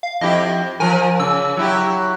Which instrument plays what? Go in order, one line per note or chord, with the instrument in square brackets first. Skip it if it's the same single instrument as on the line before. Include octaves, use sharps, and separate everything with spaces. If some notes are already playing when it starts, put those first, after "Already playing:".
[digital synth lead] F5
[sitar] F2 E4 G4 [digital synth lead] D#5
[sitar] F3 A#4 [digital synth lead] G#5
[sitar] C#3 [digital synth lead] E6
[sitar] F#3 E4 G4